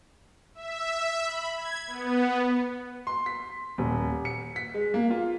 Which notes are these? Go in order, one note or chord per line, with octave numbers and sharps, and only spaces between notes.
E5
B5
G#6
B3
C6
B6
D#1
C#7
B6
G#3
A#3
F4